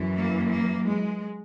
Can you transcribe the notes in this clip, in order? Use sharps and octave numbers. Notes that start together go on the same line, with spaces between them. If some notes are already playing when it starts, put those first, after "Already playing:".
Already playing: F#2 E3
A#3
A#3
G#3